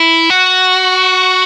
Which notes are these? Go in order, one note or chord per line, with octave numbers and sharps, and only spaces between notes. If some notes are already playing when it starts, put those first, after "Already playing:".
Already playing: E4
F#4